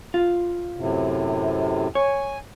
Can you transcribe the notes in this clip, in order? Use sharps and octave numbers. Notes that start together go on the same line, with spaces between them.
F4
F#2 A2 C3
C#5 G#5